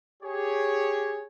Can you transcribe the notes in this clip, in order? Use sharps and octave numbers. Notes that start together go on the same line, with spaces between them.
G4 G#4 C#5